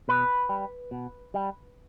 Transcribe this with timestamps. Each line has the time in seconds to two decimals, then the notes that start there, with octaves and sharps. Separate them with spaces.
0.08 B2 B4
0.49 G3
0.91 B2
1.34 G3